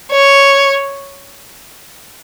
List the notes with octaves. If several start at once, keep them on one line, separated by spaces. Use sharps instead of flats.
C#5